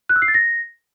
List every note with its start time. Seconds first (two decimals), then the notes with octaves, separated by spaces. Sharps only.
0.09 F#6
0.16 E6
0.22 C7
0.28 A6
0.34 A#6